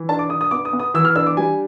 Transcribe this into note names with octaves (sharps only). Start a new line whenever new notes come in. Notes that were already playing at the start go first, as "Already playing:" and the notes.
Already playing: E3
D4 A5
D6
D4 D#6
D#6
B3 D6
D#6
B3
D#6
E3 E6
F6
D4 E6
D6
G3 G#5